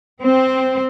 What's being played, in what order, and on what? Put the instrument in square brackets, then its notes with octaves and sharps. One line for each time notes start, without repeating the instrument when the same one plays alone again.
[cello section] C4